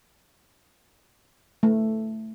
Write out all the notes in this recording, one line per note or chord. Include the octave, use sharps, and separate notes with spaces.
A3